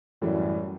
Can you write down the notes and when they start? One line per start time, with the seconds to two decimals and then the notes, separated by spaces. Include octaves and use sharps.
0.22 F#2 A2 E3 G3